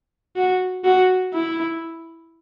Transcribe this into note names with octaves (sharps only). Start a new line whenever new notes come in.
F#4
F#4
E4